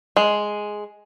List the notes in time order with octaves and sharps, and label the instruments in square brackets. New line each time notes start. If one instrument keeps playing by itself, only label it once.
[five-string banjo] G#3